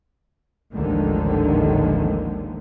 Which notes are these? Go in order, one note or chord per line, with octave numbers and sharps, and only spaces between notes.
A1 D#2 D3 D#3 F3 G#3